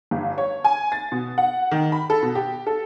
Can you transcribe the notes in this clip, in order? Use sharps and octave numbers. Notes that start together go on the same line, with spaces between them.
G1
C#5
G#5
A6
B2
F#5
D#3
B5
A4
B2
G4
A4